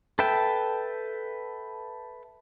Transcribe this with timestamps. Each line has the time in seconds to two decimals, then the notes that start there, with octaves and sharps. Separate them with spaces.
0.19 A4 B4 E5 G5 A5